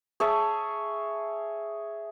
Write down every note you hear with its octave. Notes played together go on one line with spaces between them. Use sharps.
G#4 C#5 E5 A5